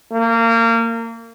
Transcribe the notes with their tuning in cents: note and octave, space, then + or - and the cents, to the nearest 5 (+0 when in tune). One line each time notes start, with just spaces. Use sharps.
A#3 -25